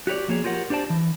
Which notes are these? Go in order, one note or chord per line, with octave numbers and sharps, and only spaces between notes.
F#4 G4 A#4 C#5 D5
F3 A#3 G#4 C#5
F4 G4 A#4 C#5 F#5
D4 G4 C5 D5 A5
E3